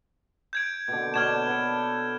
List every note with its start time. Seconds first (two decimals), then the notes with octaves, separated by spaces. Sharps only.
0.53 G6 G#6 D7
0.88 B2 D3
1.14 B2 D4 C#5 F6 G#6 E7
1.46 A4 B4